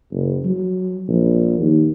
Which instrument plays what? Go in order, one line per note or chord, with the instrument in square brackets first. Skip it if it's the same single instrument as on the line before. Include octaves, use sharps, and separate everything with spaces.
[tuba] F#1
F#3
A#1
D#2